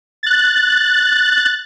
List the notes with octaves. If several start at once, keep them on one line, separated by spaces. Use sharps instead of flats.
F#6 A6